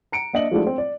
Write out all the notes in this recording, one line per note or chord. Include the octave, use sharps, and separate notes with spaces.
A#5 C#7 D7
A#3 D4 D#5 E5 F#7
F3 G#3 A3 D4 E4 F#4
C4
D5